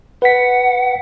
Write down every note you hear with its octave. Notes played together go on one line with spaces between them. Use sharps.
B4 F#5 B6